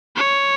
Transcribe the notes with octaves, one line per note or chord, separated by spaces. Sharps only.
C#5